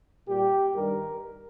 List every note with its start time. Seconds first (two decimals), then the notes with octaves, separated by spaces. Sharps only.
0.27 A#2 G3 G4
0.75 G2 D#3 G3 A#4